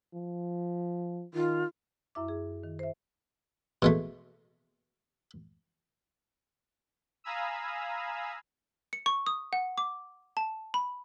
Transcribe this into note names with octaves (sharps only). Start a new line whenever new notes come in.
F3
D#3 F4
F#2 E4 E5 D6
G#4
D#3
C5 E5
B2 G#3 A3
F5 G#5 A#5 B5 D#6 E6
C#7
C#6
D#6
F#5
D6
A5
B5